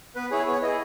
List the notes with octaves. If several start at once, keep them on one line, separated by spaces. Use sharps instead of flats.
B3 B4
E4 G#4 C#5
B3 C#5
E4 G#4 D#5